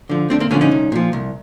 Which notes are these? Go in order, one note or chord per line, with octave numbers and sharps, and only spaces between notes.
D3 F3
D2 C4 D4
A#3 C4
D3 F3 B3 C#4
C#4 D#4
C2
A#2 F3
C2